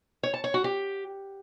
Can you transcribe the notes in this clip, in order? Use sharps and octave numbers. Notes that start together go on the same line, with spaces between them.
C#5
A5
C#5
F#4
G4